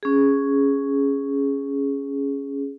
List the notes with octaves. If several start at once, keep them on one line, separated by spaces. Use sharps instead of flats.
C#4 G#4